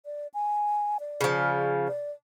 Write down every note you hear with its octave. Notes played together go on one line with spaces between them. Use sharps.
D5
G#5
D5
C#3 F3
D5